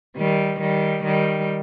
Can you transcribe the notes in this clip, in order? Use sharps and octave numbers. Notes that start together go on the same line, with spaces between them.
D#3 G3
D#3 G3
D#3 G3